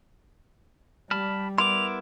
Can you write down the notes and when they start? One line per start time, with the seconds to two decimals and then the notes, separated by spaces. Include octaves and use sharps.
1.11 G3 A5 B5 F6
1.58 B3 E4 A#4 C6 D6 F7